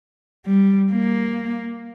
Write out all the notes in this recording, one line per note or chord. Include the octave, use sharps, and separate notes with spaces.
G3
A#3